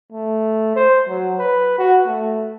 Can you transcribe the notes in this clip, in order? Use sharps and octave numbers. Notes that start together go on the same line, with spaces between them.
A3
C5
F#3
B4
F#4
A3